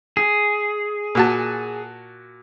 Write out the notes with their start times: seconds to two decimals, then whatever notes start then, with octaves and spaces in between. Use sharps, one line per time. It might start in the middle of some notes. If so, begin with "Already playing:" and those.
0.17 G#4
1.15 A#2 F#4 A5